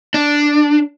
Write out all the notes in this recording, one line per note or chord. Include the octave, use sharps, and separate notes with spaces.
D4